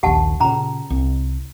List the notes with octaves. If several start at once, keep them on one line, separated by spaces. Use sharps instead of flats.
D#1 A#1 D#2 G4 F#5 A5
A#2 C#3 C#4 A#5 B5
C2